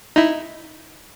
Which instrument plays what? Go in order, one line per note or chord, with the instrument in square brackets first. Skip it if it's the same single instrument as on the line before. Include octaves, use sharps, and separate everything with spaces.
[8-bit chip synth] D#4 E4